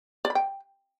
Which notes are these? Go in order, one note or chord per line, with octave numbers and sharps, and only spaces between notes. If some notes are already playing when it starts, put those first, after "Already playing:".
D5
B5
G5